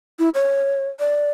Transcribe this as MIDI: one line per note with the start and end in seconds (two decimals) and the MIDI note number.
0.19 0.29 64
0.35 0.88 73
1.00 1.31 74